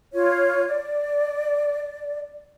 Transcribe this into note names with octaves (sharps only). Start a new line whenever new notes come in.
F4 C#5
D5